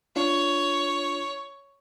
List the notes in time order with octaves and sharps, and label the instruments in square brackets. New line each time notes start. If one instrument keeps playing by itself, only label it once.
[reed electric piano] D4 F4 [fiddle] C#5